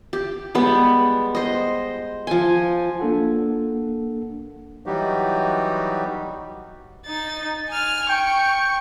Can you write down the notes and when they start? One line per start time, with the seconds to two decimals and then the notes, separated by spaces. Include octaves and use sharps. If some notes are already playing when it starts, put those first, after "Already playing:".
0.13 G4
0.55 G3 G#3 B3
1.35 C5 D#5
2.27 F3 G#5
3.00 A#3 D4 A4 F#5
4.86 E3 F#3 G3 D#4 F#4 G4
7.06 D#4 A6
7.69 G#5 F6
8.10 G5 C#6